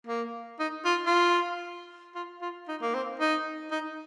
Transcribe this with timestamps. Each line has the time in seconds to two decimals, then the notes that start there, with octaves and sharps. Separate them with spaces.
0.07 A#3
0.60 D#4
0.85 F4
1.06 F4
2.15 F4
2.42 F4
2.68 D#4
2.81 A#3
2.94 C4
3.20 D#4
3.71 D#4